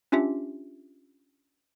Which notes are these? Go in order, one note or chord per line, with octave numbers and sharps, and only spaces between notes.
C#4 D4 F4 G4 E5